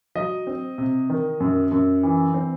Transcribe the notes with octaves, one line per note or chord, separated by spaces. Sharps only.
F#3 D#5
C4
C3
D#3
F#2
F#2
E3
C4